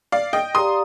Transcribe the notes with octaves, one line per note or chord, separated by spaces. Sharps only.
D5 F5
D#5 G5
G4 D5 F5 A#5 C6 D#6